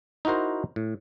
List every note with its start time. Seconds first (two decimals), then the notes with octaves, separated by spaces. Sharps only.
0.25 D#4 E4 F#4 A#4 C5
0.76 A2